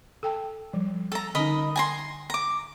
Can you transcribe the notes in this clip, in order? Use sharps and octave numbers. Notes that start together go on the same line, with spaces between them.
A4 G5 A5
F3 G3
A4 A#5
D3 C#4 D#4 A#4 D#5 B5
G#5 A#5 C6
A#5 D6